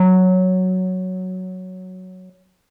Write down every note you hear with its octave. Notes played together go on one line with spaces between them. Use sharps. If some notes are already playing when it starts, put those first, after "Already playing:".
Already playing: F#3